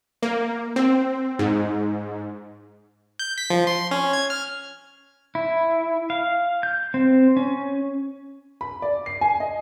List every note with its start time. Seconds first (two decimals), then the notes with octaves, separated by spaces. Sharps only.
0.23 A#3
0.76 C4
1.39 G#2
3.19 G6
3.38 B6
3.50 F3
3.67 C6
3.91 C#4
4.13 G#6
4.30 F6
5.35 E4
6.10 F5
6.63 G6
6.94 C4
7.37 C#4
8.61 B5
8.82 D5
9.06 C7
9.21 G#5
9.40 D#5